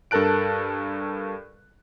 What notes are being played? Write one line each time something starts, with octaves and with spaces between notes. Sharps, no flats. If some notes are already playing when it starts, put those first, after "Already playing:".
G2 A4 A#4 A5 F#6 D7